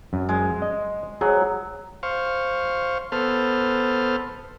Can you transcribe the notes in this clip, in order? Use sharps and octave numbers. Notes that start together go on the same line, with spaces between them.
F#2
G#3
D#5
F#3 G#4
C5 F5 C#6
B3 A4 C5 F6